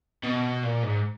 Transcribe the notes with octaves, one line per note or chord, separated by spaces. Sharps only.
B2
A#2
G#2